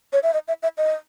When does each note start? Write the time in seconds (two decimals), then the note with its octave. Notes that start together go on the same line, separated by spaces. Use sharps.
0.13 C#5
0.23 E5
0.33 D#5
0.48 E5
0.63 E5
0.78 D#5